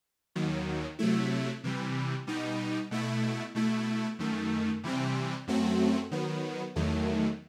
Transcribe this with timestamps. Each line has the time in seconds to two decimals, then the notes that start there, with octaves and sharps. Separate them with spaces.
0.35 D#2 D#3 F#3
0.99 C3 F#3 A3 E4
1.64 C3 E3 G3
2.27 B2 G3 D#4
2.91 B2 A3 E4
3.55 B2 A3 E4
4.19 F#2 D#3 A3
4.83 C3 E3 G3 C4
5.47 F#2 F#3 A3 C4 F#4
6.11 D#3 F#3 B3
6.76 E2 D#3 F#3 A3